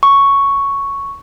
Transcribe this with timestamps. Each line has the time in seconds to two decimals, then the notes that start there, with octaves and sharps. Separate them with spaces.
0.03 C#6